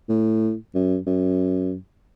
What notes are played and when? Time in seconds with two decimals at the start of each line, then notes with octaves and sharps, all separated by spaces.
0.09 A2
0.75 F#2
1.07 F#2